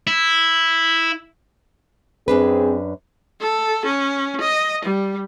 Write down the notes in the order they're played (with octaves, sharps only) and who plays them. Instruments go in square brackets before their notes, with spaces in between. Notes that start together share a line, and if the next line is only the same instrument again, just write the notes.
[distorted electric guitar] E4
[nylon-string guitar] F#2 D4 B4 [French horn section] C4 G#4
[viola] A4
C#4
D#5
G3